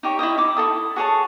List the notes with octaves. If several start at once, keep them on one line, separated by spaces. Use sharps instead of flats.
D#4 G4 C#5
E4 D#5 G5 D#6
D#4 E5 D6
E4 F4 A4 D#6
F#4 G#4 C#5 A5